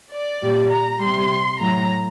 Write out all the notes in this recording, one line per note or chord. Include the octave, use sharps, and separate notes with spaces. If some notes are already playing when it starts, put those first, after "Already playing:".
D5
A#2 G3
A#5
C3 G3 C6
A2 F#3 A#5